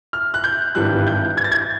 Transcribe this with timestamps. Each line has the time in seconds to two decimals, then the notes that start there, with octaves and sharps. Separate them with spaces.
0.13 F6
0.34 F#6
0.44 G6
0.75 G#1 G2 E3 G3 F#6
1.07 G6
1.37 G#6
1.44 A6
1.51 G#6